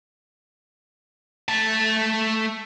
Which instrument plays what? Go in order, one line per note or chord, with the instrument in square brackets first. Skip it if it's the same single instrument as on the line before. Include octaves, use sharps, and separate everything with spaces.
[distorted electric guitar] A3 A5